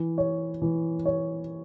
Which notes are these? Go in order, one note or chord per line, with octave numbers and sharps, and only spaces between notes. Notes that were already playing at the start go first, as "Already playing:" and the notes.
Already playing: E3
C#5
E3
C#5